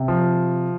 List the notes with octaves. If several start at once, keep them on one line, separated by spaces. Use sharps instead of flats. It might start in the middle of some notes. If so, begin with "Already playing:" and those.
Already playing: C3
F3